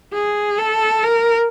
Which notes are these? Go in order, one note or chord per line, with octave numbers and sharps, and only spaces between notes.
G#4
A4
A#4